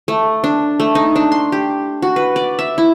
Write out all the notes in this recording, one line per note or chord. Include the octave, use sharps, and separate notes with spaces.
A3
D4
A3
D#4
D4
C6
G4
F#4
B4
D5
E5
E4